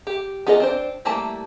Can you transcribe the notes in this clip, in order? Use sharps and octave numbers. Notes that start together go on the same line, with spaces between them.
G4
B3 F4 G#4 A#4 D#5
C4 D4 C5
G3 A3 A#3 E4 A5